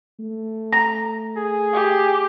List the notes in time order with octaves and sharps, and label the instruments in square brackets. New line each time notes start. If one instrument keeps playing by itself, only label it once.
[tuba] A3
[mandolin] A#5
[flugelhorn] G#4
[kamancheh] G4